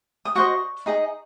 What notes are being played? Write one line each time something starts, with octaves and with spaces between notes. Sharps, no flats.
D#6
F#4 C5 D#5 C#6
D#4 G#4 D#5